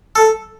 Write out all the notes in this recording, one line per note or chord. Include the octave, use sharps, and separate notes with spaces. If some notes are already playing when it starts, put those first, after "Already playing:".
A4